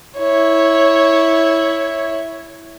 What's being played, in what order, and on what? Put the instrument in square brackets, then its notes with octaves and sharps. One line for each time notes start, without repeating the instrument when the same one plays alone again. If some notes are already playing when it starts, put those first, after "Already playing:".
[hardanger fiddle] E4 C#5